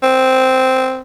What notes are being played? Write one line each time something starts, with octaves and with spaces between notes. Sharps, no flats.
C4